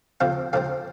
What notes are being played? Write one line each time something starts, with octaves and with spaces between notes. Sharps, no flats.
F2 C3 F3 C4 F5
F2 C3 F3 C4 F5